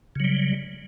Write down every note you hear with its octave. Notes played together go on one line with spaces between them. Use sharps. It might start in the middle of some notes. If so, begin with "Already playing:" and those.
C#3 F#3 G3